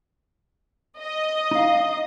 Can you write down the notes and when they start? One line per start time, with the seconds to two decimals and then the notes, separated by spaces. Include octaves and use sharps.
1.00 D#5
1.51 D#4 F5